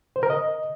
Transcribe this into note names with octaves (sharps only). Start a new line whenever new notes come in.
C5
A#4
D#5